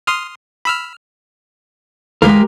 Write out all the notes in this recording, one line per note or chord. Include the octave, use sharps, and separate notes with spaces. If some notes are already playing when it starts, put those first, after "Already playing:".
C6 D#6 F6
B5 E6 F6
D2 E3 G#3 G4 A#4 F5